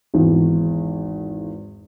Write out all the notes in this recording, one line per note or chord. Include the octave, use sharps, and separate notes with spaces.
G#1 E2